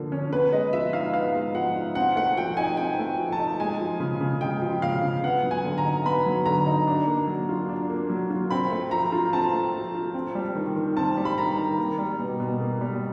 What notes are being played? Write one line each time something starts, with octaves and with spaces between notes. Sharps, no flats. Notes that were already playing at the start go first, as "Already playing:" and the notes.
Already playing: D3 F3 A#3
C#4
B3 B4
G#3 D#5
F3 E5
D#4 F5
B3 F5
G#3
F3 F#5
D#4
C4 F#5
A3 F#5
F3 G5
D#4 G#5
C4 G5
A3
F3
A5
D#4
G#3 G#5
F3
C#3
C#3
G#3 G5
F3
C#3 F5
C#3
B3 F#5
F#3
G#5
D3
A#5
D#4
B3 B5
F#3
D3 A#5
D#4
D4
A#3
F#3
F4
D4
A#3
F#3
F4
C4 B5
A3
F3 A#5
F4
C4 A5
A3
F3
F4
C4
G3
D#3
D#3
C4 A5
G3
B5
D#3 A#5
D#3
A#3
G3
B2
B2
A#3
G3